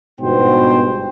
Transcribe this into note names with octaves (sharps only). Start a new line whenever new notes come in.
G1 G#2 B2 B3 C5 G5